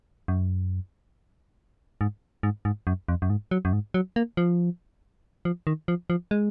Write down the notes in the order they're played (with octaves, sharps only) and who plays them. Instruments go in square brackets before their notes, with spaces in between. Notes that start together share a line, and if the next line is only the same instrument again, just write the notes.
[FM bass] F#2
G#2
G#2
G#2
F#2
F2
F#2
G#2
F#3
F#2
G#2
F#3
A#3
F3
F3
D#3
F3
F3
G#3